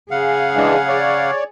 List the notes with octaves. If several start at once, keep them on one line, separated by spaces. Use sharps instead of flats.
C#3 G#4 F5 F#5
E3 G#3 D4
C#5 D5